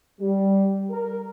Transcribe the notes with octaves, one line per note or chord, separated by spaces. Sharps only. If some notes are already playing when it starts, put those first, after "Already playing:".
G3
A#4